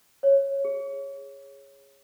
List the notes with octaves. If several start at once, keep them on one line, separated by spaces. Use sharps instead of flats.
C#5
G#4